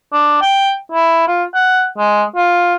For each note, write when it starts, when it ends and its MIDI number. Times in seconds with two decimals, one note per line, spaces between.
0.13 0.40 62
0.42 0.74 79
0.92 1.26 64
1.28 1.44 65
1.54 1.86 78
1.98 2.23 56
2.36 2.75 65